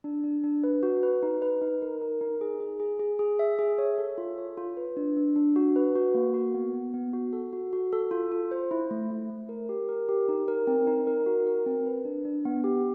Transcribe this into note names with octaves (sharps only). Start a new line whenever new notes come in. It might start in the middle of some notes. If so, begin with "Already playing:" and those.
D4
D4
D4
B4
F#4
B4
D#4
B4
D#4
A#4
A#4
D#4
G#4
G#4
G#4
G#4
G#4
E5
G#4
C#5
A4
F4
C#5
F4
B4
D4
D4
D4
F#4
B4
F#4
A#3
F#4
B3
B3
B3
F#4
A4
F#4
F#4
A4
F4
F4
C5
E4
A3
A3
A3
A#4
G4
A#4
G4
D#4
A#4
C4
D#4
A#4
F#4
A#4
C4
B4
D4
D4
B3
G4